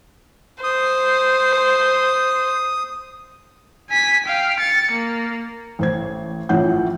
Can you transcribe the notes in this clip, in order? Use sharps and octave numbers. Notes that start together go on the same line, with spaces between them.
C5 D#6
G#5 B6
F5 G5
A6 C#7
A#3
A1 C5 G#6
A1 A2 F3 C#4 F#5 G6